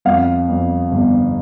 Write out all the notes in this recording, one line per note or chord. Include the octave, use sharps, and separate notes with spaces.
F2 F5
F2
G1